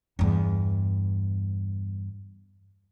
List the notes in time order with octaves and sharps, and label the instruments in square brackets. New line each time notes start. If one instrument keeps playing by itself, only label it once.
[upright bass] E2 G2